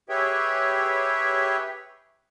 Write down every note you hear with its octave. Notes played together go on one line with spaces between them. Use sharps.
G4 G#4 B4 C#5 E5 G5